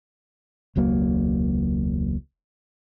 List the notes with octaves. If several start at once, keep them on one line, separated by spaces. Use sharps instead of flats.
E1 C#2 F#3 A#3